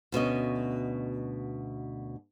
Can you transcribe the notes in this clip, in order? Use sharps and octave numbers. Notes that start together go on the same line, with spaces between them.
D2 B2 C#4 D#5